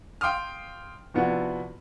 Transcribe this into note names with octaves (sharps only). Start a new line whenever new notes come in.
F5 G5 C6 D6 D#6 F6
C3 F3 B3 D4 E4 F#4